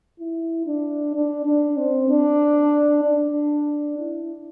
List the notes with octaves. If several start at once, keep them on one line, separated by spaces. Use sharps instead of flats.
E4
D4
D4
D4
C4
D4
D4
E4